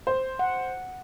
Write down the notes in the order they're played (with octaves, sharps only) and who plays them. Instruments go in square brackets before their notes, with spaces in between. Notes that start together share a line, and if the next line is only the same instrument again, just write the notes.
[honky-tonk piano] C5
[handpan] F#5